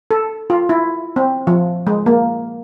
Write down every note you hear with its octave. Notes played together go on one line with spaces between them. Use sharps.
A4
F4
E4
C4
F3
G#3
A#3